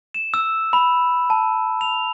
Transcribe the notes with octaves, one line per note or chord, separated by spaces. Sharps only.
E7
E6
B5
A5
F7